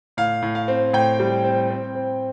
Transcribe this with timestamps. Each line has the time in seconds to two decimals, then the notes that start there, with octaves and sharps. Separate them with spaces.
0.17 A2 F5
0.42 A2
0.55 F5
0.68 C4
0.93 A2 G5
1.20 G3
1.44 C4
1.70 C4
1.95 C4